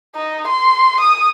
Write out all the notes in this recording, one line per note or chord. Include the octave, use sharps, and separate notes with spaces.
D#4
C6
D#6